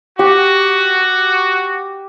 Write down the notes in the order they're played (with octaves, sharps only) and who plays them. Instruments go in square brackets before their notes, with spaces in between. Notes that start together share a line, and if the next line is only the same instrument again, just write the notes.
[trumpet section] F#4 [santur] G4